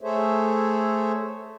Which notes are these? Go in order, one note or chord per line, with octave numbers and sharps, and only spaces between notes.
A3 G#4 A4 C5 C#5 E5